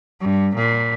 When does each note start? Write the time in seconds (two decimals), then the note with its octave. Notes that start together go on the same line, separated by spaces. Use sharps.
0.21 G2
0.55 A#2